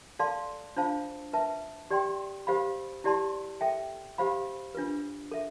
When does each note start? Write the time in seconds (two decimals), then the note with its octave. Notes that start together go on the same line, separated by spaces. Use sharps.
0.19 A4 D5 F5 A5 C6
0.76 D4 F4 C5 F5 A5
1.33 B4 E5 A5
1.90 G4 D5 G5 C6
2.47 G4 C5 F5 B5
3.04 E4 G4 D5 A5 C6
3.61 A4 E5 G5
4.18 G4 C5 F5 B5
4.75 D4 F4 B4
5.31 A4 E5